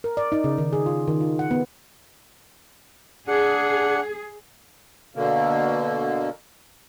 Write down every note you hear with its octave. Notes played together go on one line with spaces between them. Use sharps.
A#4
D5
D#4
C#3
D#3
G#4
F4
D#3
F4
F#5
B3
D4 G#4 F#5
B2 D3 A#3